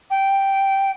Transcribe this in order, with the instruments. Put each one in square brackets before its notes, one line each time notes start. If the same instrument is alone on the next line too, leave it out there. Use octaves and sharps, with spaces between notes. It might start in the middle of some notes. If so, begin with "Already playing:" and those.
[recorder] G5